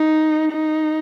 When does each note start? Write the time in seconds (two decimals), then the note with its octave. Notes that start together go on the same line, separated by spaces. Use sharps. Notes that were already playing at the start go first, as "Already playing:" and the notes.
Already playing: D#4
0.51 D#4